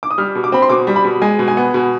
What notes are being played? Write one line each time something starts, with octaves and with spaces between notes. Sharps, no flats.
D6
D#6
G3 F6
B2
D6
C4 B5
C6
B2 D6
G3
B5
B2
G#3 G#5
B2
G#5
B3
B2